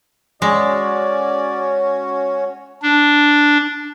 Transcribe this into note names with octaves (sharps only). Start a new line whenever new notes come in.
G#3 C#4 F#4 C#5 D5
D4